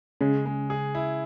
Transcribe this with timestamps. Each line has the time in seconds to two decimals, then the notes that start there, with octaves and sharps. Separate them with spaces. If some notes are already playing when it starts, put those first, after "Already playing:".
0.21 C#3 G#3
0.46 G#3
0.70 G#4
0.95 E4